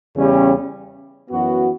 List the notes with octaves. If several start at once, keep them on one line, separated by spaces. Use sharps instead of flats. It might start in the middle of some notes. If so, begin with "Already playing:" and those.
E2 C#3 G3 C#4 G4
F#2 E3 B3 F#4